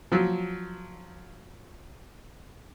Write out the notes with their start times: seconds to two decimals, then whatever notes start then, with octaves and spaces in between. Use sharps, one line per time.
0.12 F3 F#3